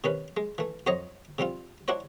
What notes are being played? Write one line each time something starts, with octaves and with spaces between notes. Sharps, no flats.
C3 D#3 C#4 B4
G#3
E3 A3
F2 F#3 C5 C#5 D#5 A#5
C3 G3 C4 F4
D4 E4 F#4 C5 C#5